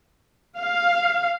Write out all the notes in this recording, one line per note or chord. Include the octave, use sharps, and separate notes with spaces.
F5